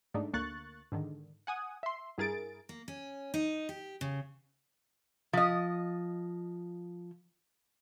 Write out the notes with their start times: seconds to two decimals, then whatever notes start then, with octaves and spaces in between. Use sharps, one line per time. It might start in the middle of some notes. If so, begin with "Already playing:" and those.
0.14 G#2 A3 D4 D#4
0.34 D2 A#3 C#6 F#6 A6
0.92 G#2 D3 D#3
1.47 F#5 G#5 D#6
1.83 E5 C6
2.18 G2 E4 G#4 A#4 A6 D7
2.69 A#3
2.88 C#4
3.34 D#4
3.69 G4
4.01 C#3
5.33 F3 D#5